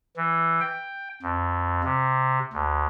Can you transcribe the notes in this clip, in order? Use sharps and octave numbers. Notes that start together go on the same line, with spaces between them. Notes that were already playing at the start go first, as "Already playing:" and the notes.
E3
G5
F2
C3
D2